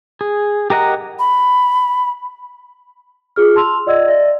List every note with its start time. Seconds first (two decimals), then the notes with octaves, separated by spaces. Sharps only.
0.21 G#4
0.70 G4 A#4 D#5 F#5 A#5
1.19 B5
3.36 F4 G#4 F6
3.56 A5 C6 E6 F7
3.86 F4 D5 D#5 F#5 E6 G#6
4.08 D5 E5 A#6